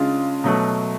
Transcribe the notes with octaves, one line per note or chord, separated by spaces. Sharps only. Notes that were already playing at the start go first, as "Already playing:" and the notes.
Already playing: C#3 G#3 D4 F4
B2 F#3 A3